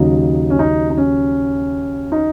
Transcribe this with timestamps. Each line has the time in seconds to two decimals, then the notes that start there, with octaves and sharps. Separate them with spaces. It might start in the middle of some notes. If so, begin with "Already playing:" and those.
Already playing: D#2 C#3 F#3 D#4
0.50 C#4
0.59 D#4
0.90 D#4
0.97 C#4
2.12 D#4